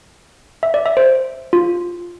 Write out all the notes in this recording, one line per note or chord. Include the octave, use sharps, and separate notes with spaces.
E5
D5
E5
C5
F4